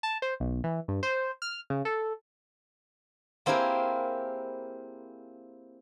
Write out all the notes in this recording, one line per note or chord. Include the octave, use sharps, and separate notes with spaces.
A5
C5
B1
E3
G2
C5
F6
C#3
A4
A#3 C4 E4 G4 G#4 A#4